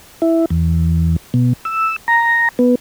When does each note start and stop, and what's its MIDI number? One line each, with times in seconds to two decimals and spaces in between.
0.22 0.45 64
0.50 1.16 40
1.34 1.53 47
1.65 1.96 88
2.08 2.49 82
2.59 2.75 59